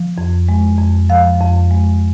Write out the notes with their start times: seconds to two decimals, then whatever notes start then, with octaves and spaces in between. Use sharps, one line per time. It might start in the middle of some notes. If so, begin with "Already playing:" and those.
Already playing: F3
0.18 F2
0.49 G#3
0.79 F2
1.10 F3 F5
1.41 F2
1.71 G#3